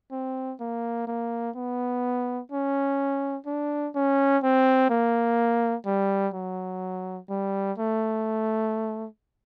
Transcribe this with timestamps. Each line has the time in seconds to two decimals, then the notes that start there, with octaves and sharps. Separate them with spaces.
0.11 C4
0.60 A#3
1.07 A#3
1.55 B3
2.52 C#4
3.46 D4
3.95 C#4
4.43 C4
4.90 A#3
5.86 G3
6.34 F#3
7.29 G3
7.78 A3